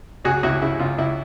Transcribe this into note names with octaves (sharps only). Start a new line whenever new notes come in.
C#2 F#4 G#4
C#2 E4 F#4
C#3 E4
C#2 F4
C#2 E4